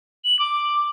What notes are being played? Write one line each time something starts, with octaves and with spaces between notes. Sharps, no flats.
F#7
D6